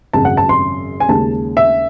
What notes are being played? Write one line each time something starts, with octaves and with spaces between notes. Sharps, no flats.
G#1 F#2 C#3 A5
F#5
A5
C6
G#5
D#2 C#3 G#3 A5
E5